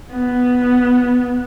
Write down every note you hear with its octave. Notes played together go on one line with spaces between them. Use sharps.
B3